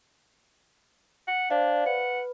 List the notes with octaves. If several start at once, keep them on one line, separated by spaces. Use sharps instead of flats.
F#5
D4 C5 D5 F5
B4 F#5